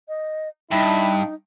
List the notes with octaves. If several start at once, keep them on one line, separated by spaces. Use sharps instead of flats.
D#5
G2 D#4 E4